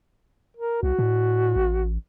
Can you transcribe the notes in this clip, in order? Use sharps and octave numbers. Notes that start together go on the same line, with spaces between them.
A#4
C2 F#4
A2
A1